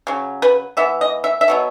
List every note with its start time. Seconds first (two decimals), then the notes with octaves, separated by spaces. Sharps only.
0.07 C#3 F#3
0.42 B4
0.77 E3 B3 E5
1.01 D#5
1.24 E5
1.41 E5
1.48 B2 F#3 B3